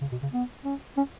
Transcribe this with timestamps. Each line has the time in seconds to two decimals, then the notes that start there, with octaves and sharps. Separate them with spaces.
0.01 C#3
0.12 B2
0.23 C#3
0.34 B3
0.65 C#4
0.97 C#4